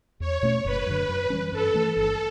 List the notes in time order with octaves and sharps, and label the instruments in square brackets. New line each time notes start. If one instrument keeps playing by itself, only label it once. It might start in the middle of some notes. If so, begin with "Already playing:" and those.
[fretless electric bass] E2 [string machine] C#5
[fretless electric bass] B2 A3 C#4
[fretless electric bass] F#1 [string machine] B4
[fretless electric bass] F#2 D3
F#2
E3 G3 C#4
[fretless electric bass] G2 [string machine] A4
[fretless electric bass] E3 A3 C#4
[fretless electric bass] G1 [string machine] A4